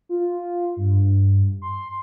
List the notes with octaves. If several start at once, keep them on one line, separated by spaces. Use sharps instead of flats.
F4
G2
C6